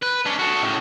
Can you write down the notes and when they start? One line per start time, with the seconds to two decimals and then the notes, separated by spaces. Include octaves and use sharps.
0.02 B4
0.26 C#4 D4
0.39 F#4 A4
0.63 A2 C#3